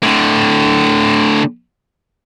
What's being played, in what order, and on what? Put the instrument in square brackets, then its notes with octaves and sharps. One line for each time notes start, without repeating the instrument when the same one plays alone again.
[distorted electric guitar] A2 D3